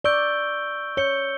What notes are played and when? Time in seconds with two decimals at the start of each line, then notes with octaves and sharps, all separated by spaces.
0.04 D5 C#6 E6 G6 D7 G7
0.97 C#5 G6 C#7 G7